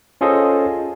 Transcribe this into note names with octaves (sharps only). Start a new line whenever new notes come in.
C#4 F4 G#4 A4 C5 D#5